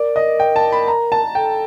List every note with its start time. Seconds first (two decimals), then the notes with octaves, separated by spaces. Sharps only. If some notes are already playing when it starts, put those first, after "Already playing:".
Already playing: A#4 D5
0.16 D#5
0.40 G5
0.56 A5
0.72 B5
0.88 A#5
1.12 A5
1.35 A4 G5